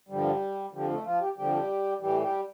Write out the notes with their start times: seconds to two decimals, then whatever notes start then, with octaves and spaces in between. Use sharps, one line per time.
0.09 G2 D3 F3 G3
0.72 F2 D3 F3 G3
0.89 A3
1.04 F3 F4
1.20 G4
1.37 F2 D3 F3 G3 G4
2.00 A2 E3 G3 G4
2.21 G3 G4